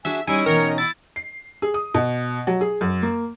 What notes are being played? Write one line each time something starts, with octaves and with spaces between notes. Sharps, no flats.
D4 F#4 G#4 E5 G#5
G3 C#4 D#4 E4 G#5 A#5
B2 E3 A#4 C#5 G5
E4 A6
C7
G#4
D#6
B2
F#3
G#4
F#2
A#3